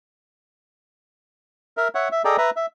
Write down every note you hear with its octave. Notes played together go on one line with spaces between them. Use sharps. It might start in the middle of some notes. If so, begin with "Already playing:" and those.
A#4 E5
C#5 E5 F#5
E5
G#4 A4 D5 D#5 G5 A#5
B4 E5 A#5
E5